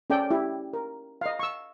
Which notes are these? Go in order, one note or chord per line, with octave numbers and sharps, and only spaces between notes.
C#4 A4 D5 G5
E4 G4
A#4
D#5 F5
C#6 E6